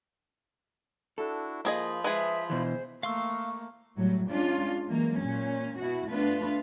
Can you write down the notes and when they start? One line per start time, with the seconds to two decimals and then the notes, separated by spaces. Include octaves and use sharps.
1.18 D4 E4 F#4 A4
1.65 F3 A#3 F4 G#4 D#5 B5
2.04 G#3 G#4 B4 E5
2.50 B2 E3 C5
3.03 A3 A#3 F5 C6 C#6 E6
3.97 A2 F#3 G3
4.28 G#3 C#4 D4 F4
4.88 E3 F#3 G#3 A#3
5.22 A#2 C#4
5.79 B2 E4 F#4
6.10 A3 B3 D4 F4 B4